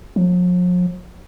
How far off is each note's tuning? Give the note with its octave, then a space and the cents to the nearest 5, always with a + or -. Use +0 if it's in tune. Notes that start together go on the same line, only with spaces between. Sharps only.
F3 +45